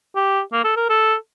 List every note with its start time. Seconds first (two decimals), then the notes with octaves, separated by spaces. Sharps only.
0.15 G4
0.52 A#3
0.64 A4
0.76 A#4
0.89 A4